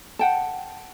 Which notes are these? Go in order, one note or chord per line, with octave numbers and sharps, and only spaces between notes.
F#5 G5 A5